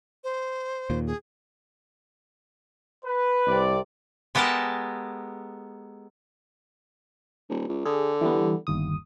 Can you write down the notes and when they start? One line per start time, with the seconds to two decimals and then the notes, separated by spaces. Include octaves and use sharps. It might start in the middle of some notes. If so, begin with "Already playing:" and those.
0.24 C5
0.90 D#2 A#2
1.07 G#4
3.05 B4
3.47 C2 C3 D5
4.35 G#3 B3 G4 A4 A#4 A5
7.50 D#1
7.68 C#2
7.85 D3 G#4
8.21 E3 G3 B3
8.67 G1 D#2 D#6